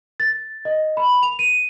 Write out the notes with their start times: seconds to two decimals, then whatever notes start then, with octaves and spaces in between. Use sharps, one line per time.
0.20 A6
0.65 D#5
0.97 B5
1.23 F7
1.39 D#7